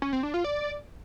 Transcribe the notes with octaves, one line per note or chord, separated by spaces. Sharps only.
C#4
C4
D4
F4
D5